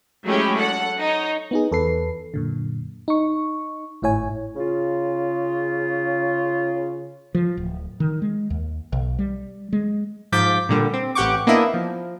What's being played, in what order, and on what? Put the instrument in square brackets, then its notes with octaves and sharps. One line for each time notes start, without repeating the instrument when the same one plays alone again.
[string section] F#3 G#3 A3 C#4 E4 G4
A4 F#5
D#4 C#5
[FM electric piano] B3 D#4 G#4
E2 A4 B4 C7
F#2 A#2 D3
D#4 C#6
G#1 A2 E4 C#5 G#5
[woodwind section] C#3 F4
[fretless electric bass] F3
D1
D#3
G#3
D#2
B1
G3
G#3
[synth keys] G#2 F3 D6 G6 A6 B6
A#2 D3 G3
C4
A1 G4 F#5 G5 C#6 D6
A#3 B3 D4 E4 D#5 E5
F3